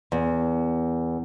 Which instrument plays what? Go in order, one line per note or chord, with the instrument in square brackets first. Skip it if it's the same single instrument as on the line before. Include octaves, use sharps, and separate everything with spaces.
[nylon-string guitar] E2